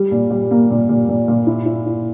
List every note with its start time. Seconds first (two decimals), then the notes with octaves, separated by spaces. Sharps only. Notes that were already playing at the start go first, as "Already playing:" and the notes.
Already playing: G3
0.11 A#2
0.31 G3
0.51 A#3
0.70 A#2
0.89 A#2
1.09 A#2
1.28 A#2
1.47 E4
1.66 E4
1.86 E4